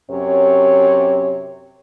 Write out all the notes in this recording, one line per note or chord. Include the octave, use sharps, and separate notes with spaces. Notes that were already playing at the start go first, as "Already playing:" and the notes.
F#2 C3 C#5